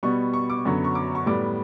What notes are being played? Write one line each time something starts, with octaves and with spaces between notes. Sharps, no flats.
B2 G3 B3 C#6
C#6
D6
F#2 D3 F#3 B3 C#6
C#6
D6
C#6
A2 G3 B3 D6